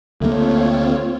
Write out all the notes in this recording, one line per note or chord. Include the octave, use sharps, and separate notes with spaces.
D2 G3 A3 A#3 C4 F4 C#5